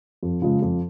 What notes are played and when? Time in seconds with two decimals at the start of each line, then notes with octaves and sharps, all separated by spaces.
0.23 F2
0.42 C#3 F3 G#3
0.62 F2